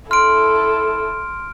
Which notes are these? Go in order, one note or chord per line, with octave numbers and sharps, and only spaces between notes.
E4 A4 C6 F6 D7